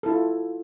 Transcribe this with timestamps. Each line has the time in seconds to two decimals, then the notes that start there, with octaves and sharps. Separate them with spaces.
0.03 A4
0.06 E4
0.09 F4